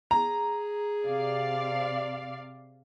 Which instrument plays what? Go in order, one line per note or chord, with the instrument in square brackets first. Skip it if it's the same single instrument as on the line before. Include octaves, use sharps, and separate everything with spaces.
[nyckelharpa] G#4 [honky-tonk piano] A#5
[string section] C3 D5 F5